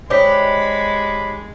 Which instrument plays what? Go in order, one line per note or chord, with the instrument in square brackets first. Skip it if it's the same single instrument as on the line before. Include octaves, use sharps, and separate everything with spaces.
[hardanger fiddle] G#3 [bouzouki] D4 D#4 G4 [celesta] C5 C#5 B6 [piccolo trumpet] B5